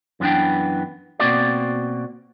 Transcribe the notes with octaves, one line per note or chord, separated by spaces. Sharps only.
F#2 E3 B3 D4 G5
B2 A#3 C4 F#4 D5